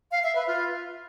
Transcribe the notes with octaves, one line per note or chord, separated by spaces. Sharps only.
F5
E5
B4
F4